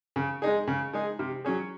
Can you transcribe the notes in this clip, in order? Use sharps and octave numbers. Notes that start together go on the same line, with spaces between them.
C#3
G#3 D#4 G#4
C#3
G#3 D#4 G#4
C3
F#3 C#4 G#4